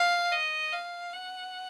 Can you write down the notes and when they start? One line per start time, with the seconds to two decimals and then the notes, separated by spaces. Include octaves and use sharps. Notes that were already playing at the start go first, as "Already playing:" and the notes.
Already playing: F5
0.32 D#5
0.73 F5
1.13 F#5